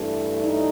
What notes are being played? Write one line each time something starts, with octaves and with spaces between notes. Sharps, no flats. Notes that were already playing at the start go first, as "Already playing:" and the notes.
Already playing: G2 E3 A3 D4
D#4